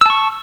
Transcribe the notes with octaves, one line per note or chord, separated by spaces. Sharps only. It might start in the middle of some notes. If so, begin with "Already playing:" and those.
A5 C#6 E6